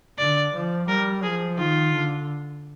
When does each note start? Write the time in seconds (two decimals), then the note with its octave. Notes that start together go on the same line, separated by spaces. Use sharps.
0.18 D3 D5
0.54 F3
0.89 G3 A#4
1.23 F3 G#4
1.58 D#3 F4
1.93 D3